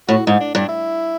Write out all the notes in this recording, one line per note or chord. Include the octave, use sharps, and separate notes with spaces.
A2 F#4
G#2 D#4
D4
G2 D4
E4